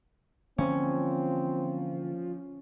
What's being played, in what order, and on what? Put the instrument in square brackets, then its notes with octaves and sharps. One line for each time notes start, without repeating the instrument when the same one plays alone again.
[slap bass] D3 E3 A#3 [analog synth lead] F3 [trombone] C4 [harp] C#4